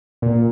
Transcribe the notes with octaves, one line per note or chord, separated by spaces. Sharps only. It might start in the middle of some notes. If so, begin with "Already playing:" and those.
A#2